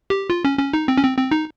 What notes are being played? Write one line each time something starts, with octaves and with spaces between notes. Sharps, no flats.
G4
F4
C#4
C#4
D#4
C4
C#4
C4
C4
D#4